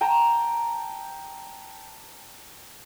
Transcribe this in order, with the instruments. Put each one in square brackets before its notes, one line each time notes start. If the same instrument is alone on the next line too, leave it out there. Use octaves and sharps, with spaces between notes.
[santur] G5 A5 A#5